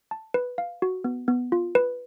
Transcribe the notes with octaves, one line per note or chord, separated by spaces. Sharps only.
A5
B4
F5
F#4
B3
B3
F4
B4